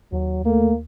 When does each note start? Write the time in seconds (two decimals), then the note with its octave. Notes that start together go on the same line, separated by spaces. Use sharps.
0.12 D#2 F#3
0.45 A3 A#3